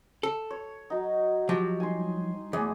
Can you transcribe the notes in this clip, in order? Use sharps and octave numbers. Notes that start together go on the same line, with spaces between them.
A4
C#5
F#3 D#4 F#5
F3 F#3 G4
G3 D#4 G#5 C6
E2 A3 G#4 D6